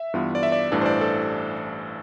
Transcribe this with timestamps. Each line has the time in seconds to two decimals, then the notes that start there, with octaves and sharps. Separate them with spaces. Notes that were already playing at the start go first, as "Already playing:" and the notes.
Already playing: E5
0.14 G2 E3 B3 F4
0.35 D5
0.43 E5
0.52 D5
0.72 A1 G2 E3 A3 D4 D5
0.81 C5
0.86 D5
1.01 A4